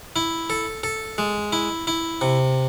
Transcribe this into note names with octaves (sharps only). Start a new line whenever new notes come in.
E4
A4
A4
G#3
E4
E4
C3